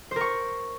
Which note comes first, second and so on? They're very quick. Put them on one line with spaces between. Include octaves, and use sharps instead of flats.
C5 A#4 C#6